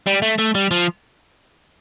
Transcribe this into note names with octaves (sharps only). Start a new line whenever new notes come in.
G3
A3
A3
G3
F3